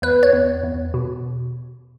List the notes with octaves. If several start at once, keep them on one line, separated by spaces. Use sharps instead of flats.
E2 B4
C#5
E2
E2
B2